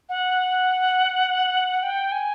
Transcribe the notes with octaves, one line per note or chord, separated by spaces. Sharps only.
F#5
G5
G#5